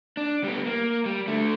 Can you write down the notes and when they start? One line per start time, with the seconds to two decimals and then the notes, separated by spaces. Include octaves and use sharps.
0.17 D4
0.44 G3 B3
0.66 A#3
1.05 G3
1.27 D3 A3